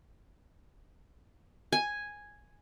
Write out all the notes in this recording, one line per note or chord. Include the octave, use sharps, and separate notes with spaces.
G#5